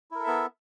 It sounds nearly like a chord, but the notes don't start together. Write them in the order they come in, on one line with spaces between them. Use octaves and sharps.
E4 A#4 A4 E5 B3